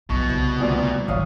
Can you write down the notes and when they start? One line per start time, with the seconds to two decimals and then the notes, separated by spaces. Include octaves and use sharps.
0.10 B1 B2 E3 F#3 C#6
0.29 C2 C#3
0.60 D2 A#2
1.08 G#1 D#3 F#3 C#5 F5 D#6